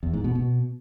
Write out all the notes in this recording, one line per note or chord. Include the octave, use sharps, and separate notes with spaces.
E2
G#2
B2
B2